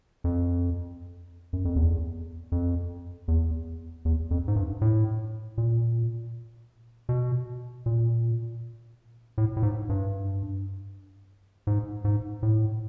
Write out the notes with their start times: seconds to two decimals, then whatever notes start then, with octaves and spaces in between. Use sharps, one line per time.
0.24 F2
1.53 F#2
1.65 F2
1.76 E2
2.52 F2
3.28 E2
4.05 E2
4.31 F2
4.48 G#2
4.56 G2
4.81 A2
5.58 A#2
7.09 B2
7.86 A#2
9.38 A2
9.57 A2
9.63 G#2
9.89 G2
11.67 G#2
12.05 G#2
12.43 A2